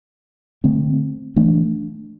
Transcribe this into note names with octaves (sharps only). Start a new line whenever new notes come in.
D3 A3 C4
E3 A3 D4